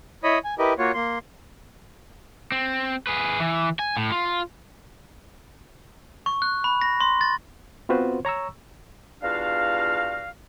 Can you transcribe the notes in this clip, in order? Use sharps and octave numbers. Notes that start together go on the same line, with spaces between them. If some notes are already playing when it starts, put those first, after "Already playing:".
E4 C#5 D#5 B5 D#6
G#5
E4 G4 A#4 B4 D#5
A#3 F4 F#4 C#5
A#3 C6
C4
G#4 B4
E3
G#5
A2
F4
C#6
F#6
B5
A#6
C6
A6
B3 C4 F4 F#4 B4 C5
C#5 A#5 C#6 E6
E2 G3 D4 F4 F#4 F5